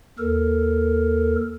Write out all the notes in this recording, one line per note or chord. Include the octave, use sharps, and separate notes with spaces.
D#2 A4 A#4